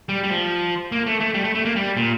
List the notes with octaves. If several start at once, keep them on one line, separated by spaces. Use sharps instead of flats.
G3
G3
F3
A#3
A3
A3
G3
A3
A3
A#3
G3
A#2